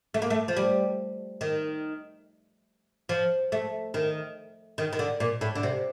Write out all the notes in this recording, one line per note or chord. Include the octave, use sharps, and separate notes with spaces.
A3
A#3
A3
F3
G3
D#3
F3
A3
D#3
D#3
D#3
D3
A#2
A2
D3
C3